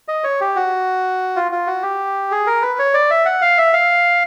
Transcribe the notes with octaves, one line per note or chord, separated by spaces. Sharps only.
D#5
C#5
G4
F#4
F4
F4
F#4
G4
G#4
A#4
B4
C#5
D5
E5
F#5
F5
E5
F5